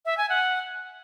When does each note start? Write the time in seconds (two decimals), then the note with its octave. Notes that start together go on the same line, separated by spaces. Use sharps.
0.05 E5
0.17 G#5
0.29 F#5